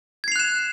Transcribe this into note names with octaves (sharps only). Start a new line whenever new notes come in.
F#6 G#6 C7 E7 F7